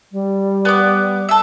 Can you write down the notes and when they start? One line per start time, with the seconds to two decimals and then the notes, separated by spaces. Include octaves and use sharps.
0.12 G3
0.65 B3 D6
1.29 A4 E5